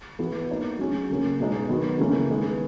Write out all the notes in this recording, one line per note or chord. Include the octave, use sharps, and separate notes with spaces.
E3 B3 F#4
A#3 D#4 F#4
F#3 C#4 G#4
C#3 F#3 A#3 C#4
B2 G#3 D#4
D#3 F#3 B3
C#3 E3 A#3 C#4
D#3 G#3 B3